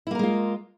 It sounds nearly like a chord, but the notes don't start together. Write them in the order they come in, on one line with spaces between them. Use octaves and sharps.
E4 A#3 A#4 G#3 F4